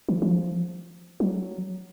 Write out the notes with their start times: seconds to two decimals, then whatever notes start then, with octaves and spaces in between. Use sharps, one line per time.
0.09 E3
0.22 F3
1.20 F#3